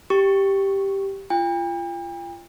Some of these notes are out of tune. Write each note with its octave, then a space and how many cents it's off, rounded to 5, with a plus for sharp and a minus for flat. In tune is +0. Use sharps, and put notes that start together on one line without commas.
G4 +0 C#6 +0
F4 -30 G5 +40